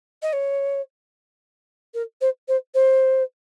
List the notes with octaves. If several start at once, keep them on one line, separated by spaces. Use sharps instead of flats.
D#5
C#5
A#4
C5
C5
C5